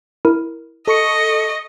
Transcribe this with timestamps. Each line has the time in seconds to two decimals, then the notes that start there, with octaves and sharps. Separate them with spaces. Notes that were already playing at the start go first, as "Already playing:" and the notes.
0.25 E4 A#4
0.88 A4 D#5 C#6 C#7